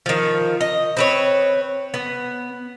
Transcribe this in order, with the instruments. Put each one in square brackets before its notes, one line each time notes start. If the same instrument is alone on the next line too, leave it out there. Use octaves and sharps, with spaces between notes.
[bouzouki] D#3 F3
D#5
C4 B4 C#5
B3